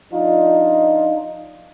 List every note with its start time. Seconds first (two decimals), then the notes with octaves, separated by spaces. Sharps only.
0.12 F3 D4 D#4 F4